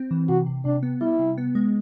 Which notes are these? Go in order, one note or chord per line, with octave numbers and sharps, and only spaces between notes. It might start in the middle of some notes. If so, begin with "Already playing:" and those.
Already playing: C4
E3
C3 F#4
C3
C3 D4
B3
G3 E4
C3
B3
G#3